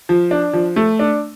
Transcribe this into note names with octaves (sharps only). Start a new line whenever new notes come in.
F3
D4
F3
A3
D4